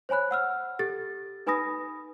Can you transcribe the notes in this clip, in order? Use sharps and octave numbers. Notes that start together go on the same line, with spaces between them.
C5 C#5 G#5 B5 F#6
F#5 E6 F6
G4 A4 A6
D#4 B4 G#5 B5 D#6 A#6